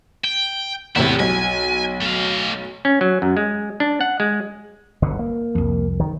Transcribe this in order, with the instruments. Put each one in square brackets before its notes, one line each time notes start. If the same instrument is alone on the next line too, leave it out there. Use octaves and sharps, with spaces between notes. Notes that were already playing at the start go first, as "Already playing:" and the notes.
[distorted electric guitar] G5
[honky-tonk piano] E2 A2 C3 [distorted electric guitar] B3 E4
[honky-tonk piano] B1 [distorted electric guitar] G#5
[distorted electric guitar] A3 F5
[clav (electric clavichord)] C#4
F#3
F#2
G#3
D4
F#5
G#3
[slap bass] G1 B2 D3
A#3
[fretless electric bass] C2 F2
[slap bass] D#3